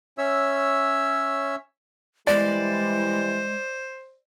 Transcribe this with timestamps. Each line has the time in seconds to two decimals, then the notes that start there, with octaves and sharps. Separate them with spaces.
0.18 C#4 C#5 E5 E6
2.27 E3 G3 G#3 E4 C5 D5